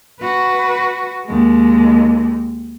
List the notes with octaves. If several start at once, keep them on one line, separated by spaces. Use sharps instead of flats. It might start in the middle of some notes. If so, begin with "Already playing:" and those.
F#4 B4
D#2 G#3